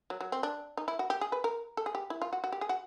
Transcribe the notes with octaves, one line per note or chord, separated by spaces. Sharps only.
F#3
F#3
C4
D4
D#4
E4
F#4
G4
G#4
B4
A#4
A4
G#4
G4
E4
F4
F#4
F#4
G4
G#4
F#4